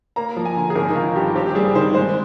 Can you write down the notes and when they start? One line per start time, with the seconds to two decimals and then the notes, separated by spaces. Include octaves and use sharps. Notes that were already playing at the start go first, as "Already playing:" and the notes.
0.16 A#3 A#5
0.37 F3
0.45 G#5
0.56 D3
0.70 G#4
0.75 G#1 A#4
0.89 D#4
0.95 D#3 F4
1.15 G2 G4
1.35 C4 G4
1.46 G4
1.55 G3 G#4
1.75 D#3 C5
1.94 G#3 C5